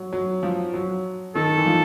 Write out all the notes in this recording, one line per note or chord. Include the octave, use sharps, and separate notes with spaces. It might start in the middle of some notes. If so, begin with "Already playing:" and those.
Already playing: F#3
F#3
F3
F#3
D#3 A4
E3
F3